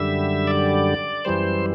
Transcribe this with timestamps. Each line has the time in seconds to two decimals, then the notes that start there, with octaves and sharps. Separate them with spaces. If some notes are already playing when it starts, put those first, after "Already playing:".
Already playing: F#2 D3 G3 E5
0.47 D5
1.25 F#2 E3 G3 C5